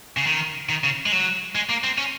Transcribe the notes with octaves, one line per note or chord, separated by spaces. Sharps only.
C#3
D#3
D#3
C#3
G#3
F#3
G#3
A#3
C4
C#4